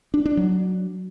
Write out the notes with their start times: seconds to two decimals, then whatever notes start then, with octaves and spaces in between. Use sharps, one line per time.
0.14 D4
0.26 D4
0.37 F#3